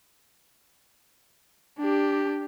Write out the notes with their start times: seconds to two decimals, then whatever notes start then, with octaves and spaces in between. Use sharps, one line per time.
1.79 D4 G4